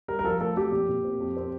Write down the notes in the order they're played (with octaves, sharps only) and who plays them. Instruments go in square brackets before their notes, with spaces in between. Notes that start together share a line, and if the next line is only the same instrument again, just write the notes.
[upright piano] G3 A#4
A#4
F3 A4
A3 A4
F3 G4
A#2
A#2
C4
F2
C4